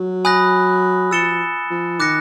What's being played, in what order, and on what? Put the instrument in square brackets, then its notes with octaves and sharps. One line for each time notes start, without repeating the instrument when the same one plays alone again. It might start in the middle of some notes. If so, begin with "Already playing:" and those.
Already playing: [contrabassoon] F#3
[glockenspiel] G#5 B5 D#6 F#6 A#6
[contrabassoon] F3 [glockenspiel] E6 A6 C#7 E7 G7
[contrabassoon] F3
[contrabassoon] D#3 [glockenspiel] D6 F#6 A#6 C#7